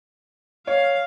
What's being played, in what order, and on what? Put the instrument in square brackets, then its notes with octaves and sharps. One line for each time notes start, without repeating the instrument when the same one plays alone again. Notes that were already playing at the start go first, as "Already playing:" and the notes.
[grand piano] C#5 [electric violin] F5